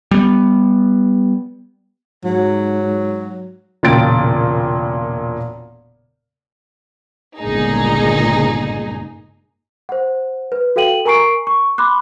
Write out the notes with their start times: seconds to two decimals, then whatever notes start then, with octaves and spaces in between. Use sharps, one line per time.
0.11 G3 B3
2.25 G#2 F#3
3.83 E1 A#2 C#3 G5 A6 D7
7.39 G1 C#2 A#2 D#4 G#4
9.89 C5 F#5
10.52 B4
10.76 F#4 A4 F5 G5 D#7 F#7
11.05 A#4 G#5 A#5 C#6 C7 D7
11.47 C#6
11.78 B5 C6 D6 F#6